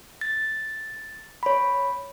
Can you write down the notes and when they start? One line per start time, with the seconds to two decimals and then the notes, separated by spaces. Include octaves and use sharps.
0.21 A6
1.43 C#5 B5